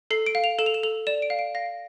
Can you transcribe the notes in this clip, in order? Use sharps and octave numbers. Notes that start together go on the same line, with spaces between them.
A4 C7
D7
F5
F7
A4 E7
F7
E7
A4 F7
D5 E7
D7
F5
D7
F5 A#6